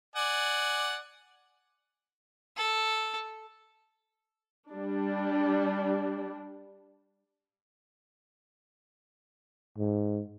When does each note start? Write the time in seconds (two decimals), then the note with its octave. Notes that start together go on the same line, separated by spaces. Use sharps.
0.16 D5 F#5 G#5
2.57 A4
4.71 G3 D4
9.78 G#2